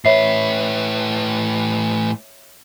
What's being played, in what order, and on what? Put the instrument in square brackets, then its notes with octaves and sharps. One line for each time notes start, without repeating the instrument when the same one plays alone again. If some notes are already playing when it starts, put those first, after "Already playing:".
[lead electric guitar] A2 B4 [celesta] C#5 E5 C7